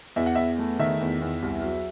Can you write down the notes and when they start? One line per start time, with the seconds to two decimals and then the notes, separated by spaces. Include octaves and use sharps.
0.16 E2 E5
0.26 F#5
0.35 E2 E5
0.59 A3
0.79 D#3 E5
1.01 E2
1.22 E2
1.42 C2
1.63 F#3